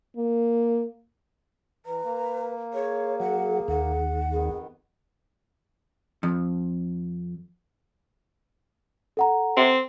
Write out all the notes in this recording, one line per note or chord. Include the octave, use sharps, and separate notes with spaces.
A#3
E3 B4 A#5
A#3
G#4 C#5
F#3 F#5
D#2 F#5
F2 D#3 B3 G#4
F2
A4 F#5 A#5
C4